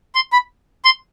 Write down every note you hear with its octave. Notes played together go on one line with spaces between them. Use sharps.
C6
B5
C6